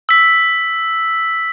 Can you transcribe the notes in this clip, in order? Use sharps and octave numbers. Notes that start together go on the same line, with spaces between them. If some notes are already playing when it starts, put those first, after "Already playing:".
E6 B6